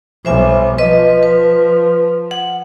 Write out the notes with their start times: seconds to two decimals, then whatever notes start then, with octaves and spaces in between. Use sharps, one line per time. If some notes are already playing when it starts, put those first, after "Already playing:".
0.25 B1 G3 C5 E5 G#5
0.78 F3 B4 D#5
1.23 B4
2.31 F#5